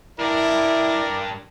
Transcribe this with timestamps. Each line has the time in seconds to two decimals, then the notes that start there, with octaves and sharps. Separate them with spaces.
0.20 G2 D4 E4 A#4 D5